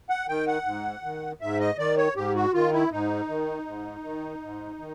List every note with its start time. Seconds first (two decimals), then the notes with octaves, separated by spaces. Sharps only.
0.10 F#5
0.28 D#3 G5
0.47 F#5
0.66 G#2
1.03 D#3
1.41 G#2 E5
1.60 D#5
1.78 D#3 D5
1.97 C#5
2.16 G#2 G4
2.35 F#4
2.54 D#3 F4
2.73 E4
2.91 G#2 D#4
3.29 D#3
3.66 G#2
4.04 D#3
4.42 G#2
4.79 D#3